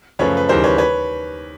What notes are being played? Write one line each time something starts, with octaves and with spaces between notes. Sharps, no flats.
F#2 C#3 F3 A3 B4 C#5
B4
D#2 C#3 E3 G3 A#4 C5
B4 C#5
B4 C#5